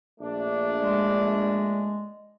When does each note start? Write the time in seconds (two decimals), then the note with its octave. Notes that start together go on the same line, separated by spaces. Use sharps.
0.21 A#1 A3 D4
0.81 G#3